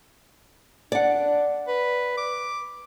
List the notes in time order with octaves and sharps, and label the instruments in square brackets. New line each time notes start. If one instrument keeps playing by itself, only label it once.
[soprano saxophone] D4 [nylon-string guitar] D5 F#5
[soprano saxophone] B4
D6